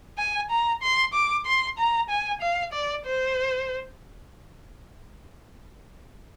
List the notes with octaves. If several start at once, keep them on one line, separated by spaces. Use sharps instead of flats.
G#5
A#5
C6
D6
C6
A#5
G#5
F5
D5
C5